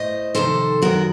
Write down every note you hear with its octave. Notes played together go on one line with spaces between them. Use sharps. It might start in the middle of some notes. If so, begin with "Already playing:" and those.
Already playing: A2 C5 D#5
F2 C3 D#3 A4 C5
F#2 D#3 F#4 A#4